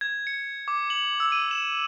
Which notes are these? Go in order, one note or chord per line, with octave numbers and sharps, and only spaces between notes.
G#6
C#7
D6
F#7
E6
D#7
E7